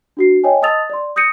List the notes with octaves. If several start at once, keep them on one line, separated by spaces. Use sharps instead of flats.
D4 F#4 C7
C#5 D#5 G5 G#5
D#5 A5 D#6 E6 A6 F7
D5 C6
D#6 G6 A#6 C#7 D#7